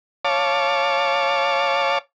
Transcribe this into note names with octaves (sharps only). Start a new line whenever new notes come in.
C#5 F5 A5 D6